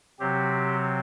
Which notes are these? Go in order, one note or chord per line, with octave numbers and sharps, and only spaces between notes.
C3 F#3 C4 G4